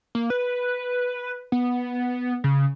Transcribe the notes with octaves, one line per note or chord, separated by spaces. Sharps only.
A#3
B4
B3
C#3